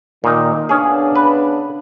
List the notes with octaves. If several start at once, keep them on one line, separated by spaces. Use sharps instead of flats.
A#2 D#3 D#4
C#3 B3 C#4 D4 G#4
B4